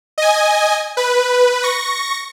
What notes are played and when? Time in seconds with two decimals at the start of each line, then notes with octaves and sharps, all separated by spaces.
0.18 D#5 G#5
0.97 B4
1.63 C#6 A#6